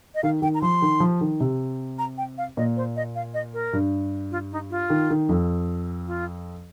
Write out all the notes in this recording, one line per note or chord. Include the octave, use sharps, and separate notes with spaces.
D#5
D#3 F5
D#3 G5
A#5
F3 C6
D#3
F3
D#3
C3
A#5
G5
F5
A#2 D#5
C5
D#5
F5
D#5
A#4
G2
F4
D#4
F4
D#3
D#3
F2
F4